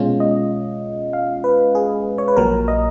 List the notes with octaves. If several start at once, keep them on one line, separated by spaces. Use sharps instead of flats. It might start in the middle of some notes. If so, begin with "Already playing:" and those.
Already playing: B2 G#3 C#4 F4
D#5
F5
B4
G#4
C#5
B4
A#1 A#2 F#3 A#4
D#5